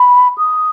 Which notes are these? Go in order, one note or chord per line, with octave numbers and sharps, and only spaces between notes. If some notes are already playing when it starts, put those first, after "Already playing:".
Already playing: B5
D#6